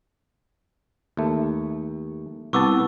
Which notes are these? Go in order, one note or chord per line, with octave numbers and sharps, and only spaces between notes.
D#2 A3
C2 B3 A5 C#6 D6 E6